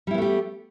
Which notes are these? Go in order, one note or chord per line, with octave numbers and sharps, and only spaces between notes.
G3 A3 B3 E4 G4